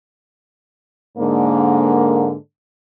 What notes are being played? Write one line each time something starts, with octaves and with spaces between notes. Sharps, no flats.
G#2 D3 A#3